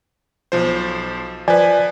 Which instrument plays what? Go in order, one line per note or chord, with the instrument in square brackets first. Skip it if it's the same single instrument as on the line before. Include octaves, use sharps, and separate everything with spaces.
[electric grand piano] B1 F3 C5
[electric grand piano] F3 B4 [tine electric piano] D5 G#5